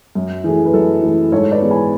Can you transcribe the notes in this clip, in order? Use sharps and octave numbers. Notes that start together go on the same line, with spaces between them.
F#2
E3 A3 G#4
B4
F#2 A4
E3 A3
G#2 A4 C#5
B4 D5
E3 G#3 B3
G#5 B5